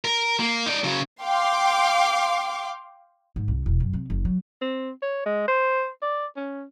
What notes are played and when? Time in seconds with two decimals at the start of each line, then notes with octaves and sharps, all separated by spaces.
0.05 A#4
0.40 A#3
0.66 D#4 D5
0.84 C#3 F#3
1.22 F5 G5 C6 D6
3.36 G#2
3.48 C2
3.66 E1
3.80 F#2
3.93 C3
4.10 F#1
4.25 F#3
4.62 C4
5.03 C#5
5.26 G#3
5.48 C5
6.02 D5
6.37 C#4